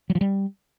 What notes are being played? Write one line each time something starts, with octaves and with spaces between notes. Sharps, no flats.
F#3
F3
G3